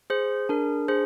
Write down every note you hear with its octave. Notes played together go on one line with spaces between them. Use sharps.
G#4 C5
D4 A#4
G#4 C5